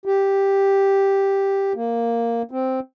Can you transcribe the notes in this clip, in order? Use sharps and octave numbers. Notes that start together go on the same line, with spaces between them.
G4
A#3
C4